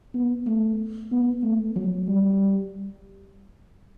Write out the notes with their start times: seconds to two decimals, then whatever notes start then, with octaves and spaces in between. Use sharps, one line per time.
0.14 B3
0.46 A3
1.12 B3
1.43 A3
1.76 F#3
2.08 G3